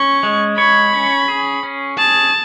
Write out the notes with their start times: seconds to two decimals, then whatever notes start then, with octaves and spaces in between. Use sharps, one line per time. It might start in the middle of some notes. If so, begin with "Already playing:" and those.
Already playing: C#4 C#6
0.23 G#3
0.58 C#5 B5
0.93 C#4
1.28 G#4
1.63 C#4
1.98 G#4 A5